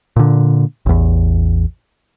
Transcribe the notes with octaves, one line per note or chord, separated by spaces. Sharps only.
A#2 D3
A1 E2